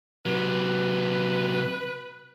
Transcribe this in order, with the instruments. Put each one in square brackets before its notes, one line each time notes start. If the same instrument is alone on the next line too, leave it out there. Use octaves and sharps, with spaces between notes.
[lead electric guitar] C3 F#3 [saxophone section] B4